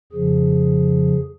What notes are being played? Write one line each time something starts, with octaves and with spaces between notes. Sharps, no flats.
F2 C#3 F3 G#4